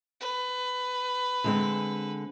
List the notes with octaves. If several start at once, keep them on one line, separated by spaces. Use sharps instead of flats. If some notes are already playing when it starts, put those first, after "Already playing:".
B4
D3 G#3 C4